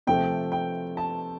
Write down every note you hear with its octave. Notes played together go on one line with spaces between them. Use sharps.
C3 F3 A3 G5
G5
A5